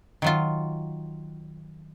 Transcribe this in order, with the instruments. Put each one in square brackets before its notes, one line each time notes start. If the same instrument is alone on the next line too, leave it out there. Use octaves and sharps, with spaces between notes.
[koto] D#3 F#3 F4